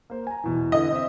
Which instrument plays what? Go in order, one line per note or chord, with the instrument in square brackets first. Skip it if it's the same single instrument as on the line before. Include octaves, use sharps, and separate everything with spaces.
[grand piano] A#3 C5
G#5 A#5
E2 B2 E3
[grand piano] D3 E3 [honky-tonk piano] D#5
[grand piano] C4 E5